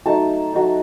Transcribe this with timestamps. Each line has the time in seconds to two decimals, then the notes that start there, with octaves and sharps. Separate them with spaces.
0.06 F#3 A3 D#4 A5
0.53 F#3 A3 D#4